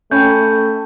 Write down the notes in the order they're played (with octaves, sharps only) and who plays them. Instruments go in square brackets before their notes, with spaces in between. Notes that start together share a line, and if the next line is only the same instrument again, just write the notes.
[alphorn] A3 [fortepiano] C#4 [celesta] G5 B5 G6